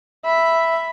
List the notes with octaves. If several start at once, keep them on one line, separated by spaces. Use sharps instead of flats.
E5 B5